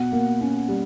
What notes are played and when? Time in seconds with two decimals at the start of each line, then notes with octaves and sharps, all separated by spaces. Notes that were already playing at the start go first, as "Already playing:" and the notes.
Already playing: B2 F#5
0.12 A#3
0.41 C#4
0.68 G3